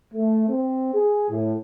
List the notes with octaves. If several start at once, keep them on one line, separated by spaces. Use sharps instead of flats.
A3
C4
G#4
A2